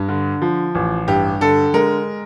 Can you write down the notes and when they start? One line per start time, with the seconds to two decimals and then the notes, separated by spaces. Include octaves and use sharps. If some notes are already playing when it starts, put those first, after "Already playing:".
Already playing: G2
0.09 D3
0.42 F3
0.75 A1
1.08 G2 G4
1.41 D3 A4
1.74 G#3 A#4